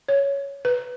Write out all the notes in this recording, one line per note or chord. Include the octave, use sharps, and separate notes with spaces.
C#5
B4